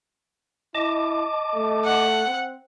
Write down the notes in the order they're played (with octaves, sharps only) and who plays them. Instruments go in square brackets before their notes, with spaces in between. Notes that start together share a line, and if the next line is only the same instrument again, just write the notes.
[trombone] E4 [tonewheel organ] D#5 A5 D6
[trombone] A3
[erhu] F#5
[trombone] C4